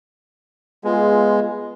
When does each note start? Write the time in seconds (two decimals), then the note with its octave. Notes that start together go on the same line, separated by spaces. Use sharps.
0.84 G#3 B3 F4 G#4